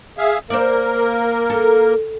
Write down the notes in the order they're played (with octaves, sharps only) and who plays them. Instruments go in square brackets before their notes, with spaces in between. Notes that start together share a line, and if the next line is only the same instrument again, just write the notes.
[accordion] G#4 E5 F5
[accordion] A#3 A#4 [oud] C5 D5
[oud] A4